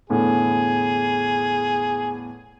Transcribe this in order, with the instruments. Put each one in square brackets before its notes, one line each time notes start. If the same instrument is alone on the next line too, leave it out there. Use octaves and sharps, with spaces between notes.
[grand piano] E2 A2 D3 [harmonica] G#4